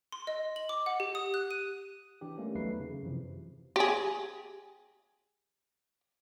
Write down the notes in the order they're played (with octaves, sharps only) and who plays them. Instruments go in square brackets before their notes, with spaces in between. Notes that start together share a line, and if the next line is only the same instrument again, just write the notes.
[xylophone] C6
D#5
F#7
D6
F#5
G4
D#6
F#6
D#7
[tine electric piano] E3 D4 G4
G3 A3 A#3 C#4
E2 F#3 A3 D#4 B4 C7
C#3
F#2 C3 E3 F3
[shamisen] G4 G#4